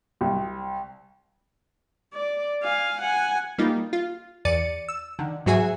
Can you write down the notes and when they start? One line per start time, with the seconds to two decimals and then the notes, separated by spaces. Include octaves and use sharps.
0.21 C2
2.14 D5
2.63 F5 G#5
3.01 F#5 G#5
3.58 G3 A#3 D#4 F4
3.93 F4
4.45 E2 D5 A6 C#7 D#7
4.88 E6
5.19 D3 D#3
5.46 G#2 F#3 F#4 G#4 E5 G#5